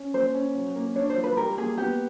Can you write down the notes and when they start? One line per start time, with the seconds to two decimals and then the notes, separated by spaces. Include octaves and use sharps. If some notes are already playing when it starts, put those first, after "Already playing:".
Already playing: C#4
0.14 A#3 C5
0.35 C#4
0.55 F#3
0.76 A#3
0.95 D4 C#5
1.10 C5
1.17 F4
1.24 B4
1.37 G3 A#4
1.57 A#3 G#4
1.78 B3 G4